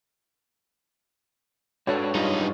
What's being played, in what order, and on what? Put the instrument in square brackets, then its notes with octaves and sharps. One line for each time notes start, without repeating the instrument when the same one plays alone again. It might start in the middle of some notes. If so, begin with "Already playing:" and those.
[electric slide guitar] G#2 D4 B4 [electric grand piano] F#4 A4 [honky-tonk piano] C#5
[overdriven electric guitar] F#2 D#4 [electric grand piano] G3 G#3 F4